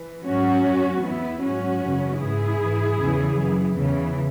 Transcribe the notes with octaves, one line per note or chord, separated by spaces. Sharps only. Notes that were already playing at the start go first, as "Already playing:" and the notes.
Already playing: E3
G#2 F#3 C#4 F#4
F#2 F#3
E2 E3 B3 E4
G#2 F#3 C#4 F#4
F#2 C#3 E3
G#2 E3 E4 G#4
G#2 E3
E2 C#3 E3
F#2 E3
E2 C#3 E3